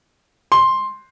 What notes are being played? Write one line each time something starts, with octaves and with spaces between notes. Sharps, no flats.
C6